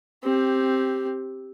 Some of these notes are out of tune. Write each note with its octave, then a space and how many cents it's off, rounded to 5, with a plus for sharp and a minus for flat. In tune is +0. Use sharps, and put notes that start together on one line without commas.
C4 +10 G4 +0